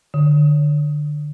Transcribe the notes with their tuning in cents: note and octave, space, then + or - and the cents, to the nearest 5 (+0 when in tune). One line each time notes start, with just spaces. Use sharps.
D3 +20